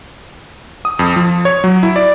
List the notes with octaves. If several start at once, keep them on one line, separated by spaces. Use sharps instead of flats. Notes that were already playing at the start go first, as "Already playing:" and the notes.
D#6
F2
F3
C#5
F#3
E4
D5